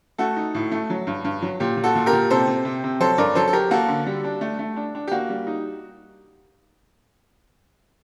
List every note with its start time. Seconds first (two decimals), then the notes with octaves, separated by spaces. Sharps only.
0.18 A3 F#4 A4
0.36 D#4
0.55 A2
0.72 A3
0.90 F#3
1.07 G2
1.24 G2
1.42 F#3
1.60 A#2 G4
1.77 A#2
1.84 F#4 A4
1.95 A#2
2.06 G4 A#4
2.13 A#2
2.30 C3 A4 C5
2.47 C3
2.65 C3
2.84 C3
3.00 F#3 A4 C5
3.18 G2 A#4 D5
3.35 F#3 A4 C5
3.48 A4
3.53 F#3 G4 A#4
3.71 A#3 F#4 A4
3.88 D3
4.06 G3
4.24 D4
4.41 A3
4.59 A3
4.76 D4
4.95 D4
5.08 G4
5.11 A#3 F#4
5.30 G3
5.47 D#4